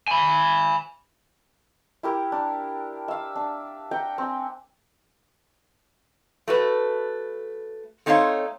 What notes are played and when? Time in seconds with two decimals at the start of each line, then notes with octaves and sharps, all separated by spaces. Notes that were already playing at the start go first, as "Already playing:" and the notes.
0.08 G#5 B5
2.03 E4 G4 A#4
2.32 D4
3.08 E5 F5
3.36 D4
3.91 E5 F#5 G5 A#5
4.18 C4 G#5
6.48 A3 F#4 B4
8.06 A3 C4 D#4 C5 C#5 F5